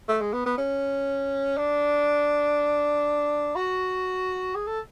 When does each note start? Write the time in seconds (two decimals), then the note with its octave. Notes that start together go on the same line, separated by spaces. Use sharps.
0.08 A3
0.21 G#3
0.33 B3
0.46 B3
0.58 C#4
1.57 D4
3.55 F#4
4.55 G#4
4.67 A4